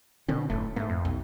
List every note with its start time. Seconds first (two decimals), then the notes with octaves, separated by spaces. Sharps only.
0.28 B2 D3 C4 C#4
0.50 F#1 A2 A3
0.76 G#2 A3 A#3
0.90 F2
1.05 B1